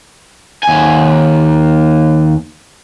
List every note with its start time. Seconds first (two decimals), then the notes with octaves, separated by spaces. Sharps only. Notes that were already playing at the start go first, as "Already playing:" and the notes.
0.63 D#2 G#5